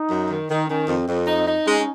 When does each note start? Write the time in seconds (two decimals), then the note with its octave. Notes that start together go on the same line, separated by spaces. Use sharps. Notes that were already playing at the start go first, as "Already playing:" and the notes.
Already playing: D#4
0.10 F#2
0.30 D#3
0.50 D#3 D#4
0.69 D#3 C#4
0.88 F2 C4
1.08 F2
1.27 D#4
1.47 D#4
1.66 G#3 C#4
1.79 C#4